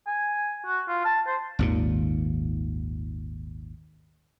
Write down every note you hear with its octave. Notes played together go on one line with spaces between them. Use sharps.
G#5
F#4
F4
A5
C5
G#1 D#2 A#2